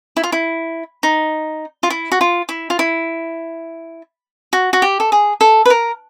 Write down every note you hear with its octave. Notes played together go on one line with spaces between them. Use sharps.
E4
F4
E4
D#4
F4
E4
F#4
F4
E4
F4
E4
F#4
F#4
G4
A4
G#4
A4
B4
A#4